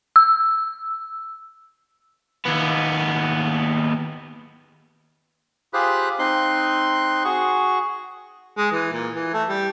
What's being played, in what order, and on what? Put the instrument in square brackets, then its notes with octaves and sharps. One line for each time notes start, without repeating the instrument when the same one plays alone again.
[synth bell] E6
[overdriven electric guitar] D#2 B3
[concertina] F4 G4 G#4 C5 B5 F#6
C4 D#4 C6 F#6
F#4 G#4 C#6
[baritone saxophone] G#3
E3
A#2
E3
A3
G3